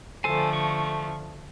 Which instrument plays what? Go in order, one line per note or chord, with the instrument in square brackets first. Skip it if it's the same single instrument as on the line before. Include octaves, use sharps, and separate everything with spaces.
[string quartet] D3 F3 A3 [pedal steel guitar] A4 C5 G#5
[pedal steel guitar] C#6